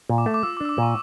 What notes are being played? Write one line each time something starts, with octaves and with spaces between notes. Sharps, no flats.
A#2
D6
A3
D6
F4 E6
D6
D4 E6
D6
A#2 C#6